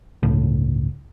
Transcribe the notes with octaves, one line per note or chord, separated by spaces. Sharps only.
G1 C#2 A2